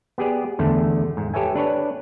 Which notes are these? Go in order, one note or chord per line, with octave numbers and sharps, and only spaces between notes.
B3 G4 G#4 D5
E2 D3 A3
G#2
G4 A4 B4 C#5 E5 G#5
D4 B4 C#5 D5